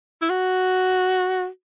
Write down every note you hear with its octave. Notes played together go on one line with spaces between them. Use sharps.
E4
F#4